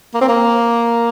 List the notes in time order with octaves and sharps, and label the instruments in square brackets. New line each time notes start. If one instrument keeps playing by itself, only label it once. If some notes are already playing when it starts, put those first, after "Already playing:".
[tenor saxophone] A#3
C4
A#3